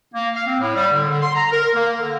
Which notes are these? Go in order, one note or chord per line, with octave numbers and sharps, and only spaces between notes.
A#3
F5
C4
A2
G3
D3
D3
C6
A#5
A#4
A#3
D3